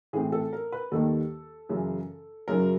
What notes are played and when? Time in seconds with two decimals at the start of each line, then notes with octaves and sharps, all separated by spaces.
0.13 A2 E3 A3 C4 G#4
0.32 A4
0.53 A#4
0.72 B4
0.92 D#2 D#3 G3 A#3 A4
1.69 F#2 C#3 E3
2.48 F#2 C#3 F#3 A#4